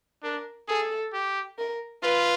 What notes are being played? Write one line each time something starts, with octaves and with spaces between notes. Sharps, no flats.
D4 A#4
G#4 A4
G4
A#4
F4 B4